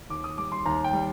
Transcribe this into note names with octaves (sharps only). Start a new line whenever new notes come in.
D#2 D6
D#6
G3 D6
C6
D#2 A#5
G5
G3